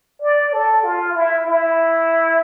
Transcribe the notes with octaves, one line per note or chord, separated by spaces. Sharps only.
D5
A4
F4
E4
E4